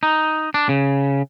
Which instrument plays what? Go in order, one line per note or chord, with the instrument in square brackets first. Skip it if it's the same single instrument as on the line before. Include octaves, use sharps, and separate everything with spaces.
[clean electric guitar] D#4
D4
C#3